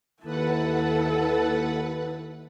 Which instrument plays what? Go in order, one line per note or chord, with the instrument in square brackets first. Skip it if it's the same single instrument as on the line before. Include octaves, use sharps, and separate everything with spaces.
[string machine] D#2 B4 F#5 [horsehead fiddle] E4 A4